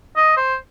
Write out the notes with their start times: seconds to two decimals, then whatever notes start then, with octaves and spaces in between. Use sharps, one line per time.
0.17 D#5
0.37 C5